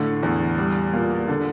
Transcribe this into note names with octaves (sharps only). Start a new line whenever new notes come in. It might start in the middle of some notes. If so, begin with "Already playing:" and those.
Already playing: A2 D3
E2
G3
A#2
D3